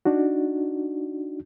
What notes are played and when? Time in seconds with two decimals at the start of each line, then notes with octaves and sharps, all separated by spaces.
0.05 D4 D#4 F#4